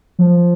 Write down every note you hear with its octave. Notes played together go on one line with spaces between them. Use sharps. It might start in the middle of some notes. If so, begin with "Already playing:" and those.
F3